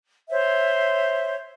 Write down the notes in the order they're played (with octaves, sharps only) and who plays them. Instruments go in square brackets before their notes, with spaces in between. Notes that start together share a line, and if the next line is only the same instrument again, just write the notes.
[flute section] C5 C#5 E5